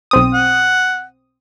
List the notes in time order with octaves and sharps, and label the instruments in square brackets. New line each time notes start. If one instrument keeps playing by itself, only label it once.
[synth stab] B1 C4 D#6
[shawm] F#5